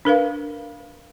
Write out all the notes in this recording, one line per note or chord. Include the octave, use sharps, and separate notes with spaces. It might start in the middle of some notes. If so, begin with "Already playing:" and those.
D4 A#4 B4 F5